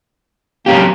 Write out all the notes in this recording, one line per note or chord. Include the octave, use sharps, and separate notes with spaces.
F#3 A#3 C#4 G4